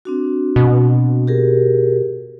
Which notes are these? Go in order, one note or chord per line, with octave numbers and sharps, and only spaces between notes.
C4 D4 F#4
B2
G4 G#4 A#4